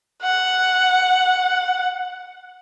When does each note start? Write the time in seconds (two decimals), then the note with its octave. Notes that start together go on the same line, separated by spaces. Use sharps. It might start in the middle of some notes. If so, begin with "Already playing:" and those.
0.22 F#5